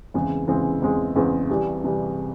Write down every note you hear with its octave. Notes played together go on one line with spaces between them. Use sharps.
E2 C#3 E3 G#3 C4
E2 C#3 E3 G#3 C4
E2 C#3 E3 G#3 C4
E2 C#3 E3 G#3 C4
C2 C3 E3 G3
C3 E3 G3